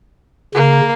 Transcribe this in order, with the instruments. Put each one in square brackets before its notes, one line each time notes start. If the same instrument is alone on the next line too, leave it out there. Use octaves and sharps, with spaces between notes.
[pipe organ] C#3 [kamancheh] A#3